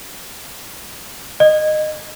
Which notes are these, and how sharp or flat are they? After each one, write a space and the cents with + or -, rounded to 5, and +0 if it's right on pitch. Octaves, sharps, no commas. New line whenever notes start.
D#5 -20